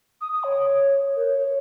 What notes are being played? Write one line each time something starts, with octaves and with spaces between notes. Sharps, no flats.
D#6
D#6
C#5
A#4
C#5